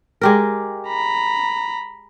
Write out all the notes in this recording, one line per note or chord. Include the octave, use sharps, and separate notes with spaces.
G#3 G4 A#4
A#5 B5